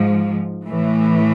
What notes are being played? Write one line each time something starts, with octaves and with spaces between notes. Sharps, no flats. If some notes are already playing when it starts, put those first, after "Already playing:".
Already playing: G#2 F3
A2 E3